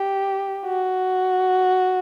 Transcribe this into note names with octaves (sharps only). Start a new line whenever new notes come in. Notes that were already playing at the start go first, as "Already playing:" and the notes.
Already playing: G4
F#4